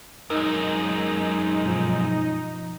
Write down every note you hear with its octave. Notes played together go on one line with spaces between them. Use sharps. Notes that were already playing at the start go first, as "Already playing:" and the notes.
F#2 G#3 D#4 A#4
G2 B2 F3